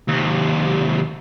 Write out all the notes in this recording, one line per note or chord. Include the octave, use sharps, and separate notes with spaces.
D#2 C3